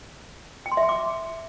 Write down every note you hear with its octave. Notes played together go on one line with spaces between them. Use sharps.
G5
C6
E5
C6
D6